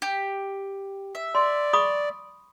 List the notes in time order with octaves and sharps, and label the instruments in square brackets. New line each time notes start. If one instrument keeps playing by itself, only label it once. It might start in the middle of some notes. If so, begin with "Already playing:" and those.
[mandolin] G4
E5
[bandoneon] D5 [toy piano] C6
[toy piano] B5 C#6 D#6